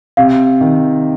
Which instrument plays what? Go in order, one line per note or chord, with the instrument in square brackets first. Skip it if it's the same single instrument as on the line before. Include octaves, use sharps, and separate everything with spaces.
[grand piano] C3 [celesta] F5
[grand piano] D#3